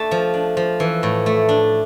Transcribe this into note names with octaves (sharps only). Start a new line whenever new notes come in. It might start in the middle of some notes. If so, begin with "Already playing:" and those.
Already playing: A3 D4 A5
F3
D4
F3
E3
A2
A3
D4